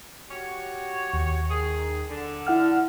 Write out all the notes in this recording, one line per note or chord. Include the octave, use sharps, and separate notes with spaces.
F#4 G4 C#5
D#2
D#3 G#4
D3
E4 F#5 F6